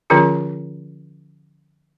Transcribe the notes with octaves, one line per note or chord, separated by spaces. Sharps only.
D3 F3 C#4 F4 G#4 G5